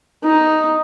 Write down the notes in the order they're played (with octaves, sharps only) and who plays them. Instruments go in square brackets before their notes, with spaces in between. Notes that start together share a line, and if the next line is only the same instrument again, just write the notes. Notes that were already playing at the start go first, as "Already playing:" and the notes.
[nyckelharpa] D#4